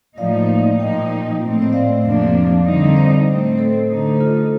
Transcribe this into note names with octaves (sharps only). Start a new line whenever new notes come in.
A2 F3 A#3 D#4 D5 F5
A#2 F3 A#3 D#4 D#5 G5
A2 A3 C4
C5 D#5
D5 F5
F2 C3 F3 A#3 D4
D3 G3 C4 D#4
C5 D#5
A2 A3 C4
A4 C5
D3 A3 D#4
F4 A4